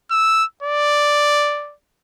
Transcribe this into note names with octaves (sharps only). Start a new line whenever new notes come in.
E6
D5